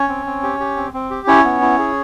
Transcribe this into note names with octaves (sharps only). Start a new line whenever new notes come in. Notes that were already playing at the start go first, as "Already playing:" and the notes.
Already playing: C#4 C#5
C4
C4
G4
G4
C4
C4
G4
C#4 E4 C#5
B3
E4
G#4